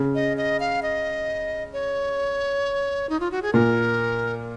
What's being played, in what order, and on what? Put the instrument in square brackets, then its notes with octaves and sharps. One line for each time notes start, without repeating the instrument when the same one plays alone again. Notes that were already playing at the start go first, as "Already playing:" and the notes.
Already playing: [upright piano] C#3
[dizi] D#5
D#5
F5
D#5
C#5
D#4
F4
F#4
G#4
[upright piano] A#2 [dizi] A#4